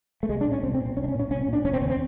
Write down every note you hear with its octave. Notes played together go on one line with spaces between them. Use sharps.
A3
C2 G#3
D4
A#2
C#4
C2 C4
C4
A#2
C4
C2 C#4
D4
C#4
A#2
C#4
C2 C#4
C#4
A#2
D4
F1 C#4
C4
D#2 C#3 C#4
C4